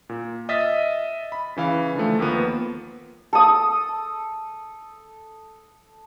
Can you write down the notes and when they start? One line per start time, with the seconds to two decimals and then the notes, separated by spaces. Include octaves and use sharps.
0.09 A#2
0.49 D#5 E5 D#6 F6 A6 B6
1.32 B5
1.56 C#3 E3 F5
1.95 D3 F3 A3
2.19 D#2 F3 A#3 B3
3.33 A4 D#6